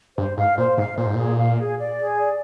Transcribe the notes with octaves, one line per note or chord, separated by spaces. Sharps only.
G2 C5
G#2 F5
A#2 C5
G#2 F5
A#2 C5
G#2
A#2 G#4
F5
G#4
D5
G#4
D5